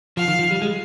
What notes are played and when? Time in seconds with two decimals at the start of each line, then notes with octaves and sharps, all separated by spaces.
0.17 F3 F5
0.28 D#3
0.39 F3
0.51 G3
0.62 G#3